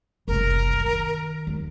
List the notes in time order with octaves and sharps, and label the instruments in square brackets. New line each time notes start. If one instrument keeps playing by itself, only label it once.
[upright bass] F#1 C2 [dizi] A#4
[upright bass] D#3
D#2